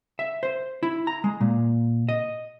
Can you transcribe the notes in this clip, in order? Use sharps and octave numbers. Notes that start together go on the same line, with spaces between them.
E5
C5
E4
A#5
G#3
A#2
D#5